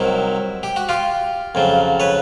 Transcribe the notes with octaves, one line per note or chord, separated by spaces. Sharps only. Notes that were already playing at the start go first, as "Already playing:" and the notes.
Already playing: C2 C3 D#3 F#3 E4 F#4
G4
F#4
F4 G4
F2 C#3 F#3
B4 C#5